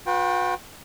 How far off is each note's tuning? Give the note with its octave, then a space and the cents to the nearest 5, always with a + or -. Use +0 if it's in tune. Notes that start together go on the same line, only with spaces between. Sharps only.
F#4 -45 B4 -5 G5 +0